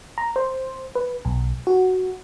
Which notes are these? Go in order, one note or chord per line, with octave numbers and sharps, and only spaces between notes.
A#5
C5
B4
B1
F#4